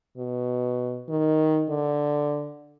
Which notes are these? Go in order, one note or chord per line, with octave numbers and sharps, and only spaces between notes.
B2
D#3
D3